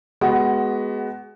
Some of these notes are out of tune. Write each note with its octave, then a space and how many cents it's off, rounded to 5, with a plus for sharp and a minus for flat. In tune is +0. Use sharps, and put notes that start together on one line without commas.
G#3 +15 B3 +0 F#4 +20